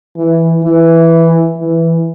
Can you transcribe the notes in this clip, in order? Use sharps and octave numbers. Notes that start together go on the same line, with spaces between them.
E3
E3
E3